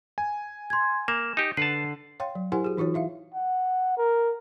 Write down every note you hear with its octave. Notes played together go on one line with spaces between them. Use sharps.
G#5
C6 G#6
A#3 E7
D#4 G4
D3 B4 F#5 A5 C7
C#5 F5 G5 C6
F#3
E4 G4 A#4 C5 F#5 G#5
F#4 G#4
E3 D#4 F4 F#4 C#5
E4 E5 F5
F#5
A#4